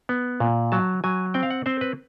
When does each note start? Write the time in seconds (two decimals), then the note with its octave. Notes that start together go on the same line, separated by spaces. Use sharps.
0.09 B3
0.40 A#2
0.72 F#3 A5
1.04 F#3 G#5
1.34 C4 G5
1.43 F5
1.50 F#5
1.66 C4 C5
1.81 B4